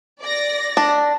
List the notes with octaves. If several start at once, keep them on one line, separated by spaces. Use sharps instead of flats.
D5 A#6
D4